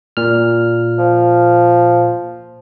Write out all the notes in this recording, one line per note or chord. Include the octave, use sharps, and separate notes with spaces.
A#2 F6
F3